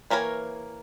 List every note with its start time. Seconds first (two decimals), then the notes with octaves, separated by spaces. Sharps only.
0.10 E3 A#3 A#4 C#5 G#5